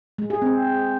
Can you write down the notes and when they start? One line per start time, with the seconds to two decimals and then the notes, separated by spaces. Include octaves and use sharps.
0.18 G#3
0.30 G#4
0.42 C4